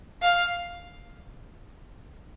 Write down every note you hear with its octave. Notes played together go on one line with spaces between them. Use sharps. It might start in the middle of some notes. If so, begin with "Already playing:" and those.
F5